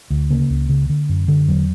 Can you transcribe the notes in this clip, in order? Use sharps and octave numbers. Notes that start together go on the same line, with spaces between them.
D2
C#3 A#3
C#2
C#3
D3
F#2
D3
E2 F#3